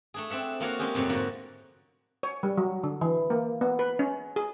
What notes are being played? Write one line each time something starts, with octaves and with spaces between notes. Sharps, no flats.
A3 D4 G#4
C4 D4 E5 F#5
A#3 D4 F#4 C#5 F5 A#5
G#3 C4 C#4 G4 G#4
F2 A2 C3 F#3
G#2 D3 A#3 F#4
C#5
G3
F#3
D3
E3
A#3
B3
B4
C#4
G#4